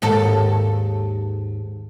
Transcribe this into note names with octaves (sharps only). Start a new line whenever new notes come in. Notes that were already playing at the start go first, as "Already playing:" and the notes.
D#2 G#2 A4